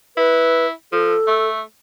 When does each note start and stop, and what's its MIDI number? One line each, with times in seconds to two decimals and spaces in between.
0.17 0.71 64
0.17 0.66 71
0.92 1.15 53
0.92 1.48 69
1.27 1.61 57